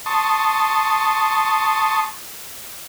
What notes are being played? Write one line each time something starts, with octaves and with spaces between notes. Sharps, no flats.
A5 C6 C#6 D#6